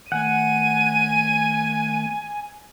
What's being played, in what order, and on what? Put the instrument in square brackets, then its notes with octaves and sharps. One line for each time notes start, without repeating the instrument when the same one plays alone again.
[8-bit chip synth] D#3 A3 [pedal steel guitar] F#5 [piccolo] G#5 [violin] D#7